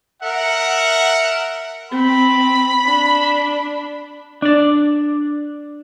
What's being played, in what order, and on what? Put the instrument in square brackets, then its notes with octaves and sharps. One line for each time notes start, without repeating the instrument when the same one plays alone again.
[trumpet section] A#4 E5 F#5
[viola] C4 [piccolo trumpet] B5
[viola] D4
[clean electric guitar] D4 D5